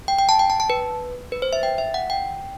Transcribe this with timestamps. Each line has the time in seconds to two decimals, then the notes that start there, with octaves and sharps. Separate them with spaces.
0.08 G5
0.18 G5
0.29 A5
0.39 G5
0.50 A5
0.60 A5
0.70 B4
1.32 B4
1.42 C5
1.53 E5
1.63 G5
1.78 E5
1.94 F#5
2.10 G5